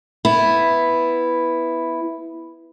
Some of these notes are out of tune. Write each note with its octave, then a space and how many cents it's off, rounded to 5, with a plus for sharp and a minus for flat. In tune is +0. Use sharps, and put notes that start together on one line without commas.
B3 +5 E4 +0